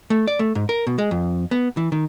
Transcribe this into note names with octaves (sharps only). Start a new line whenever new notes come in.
A3
D5
A3
G#2
A#4
B2
G#3
F2
B3
E3
D#3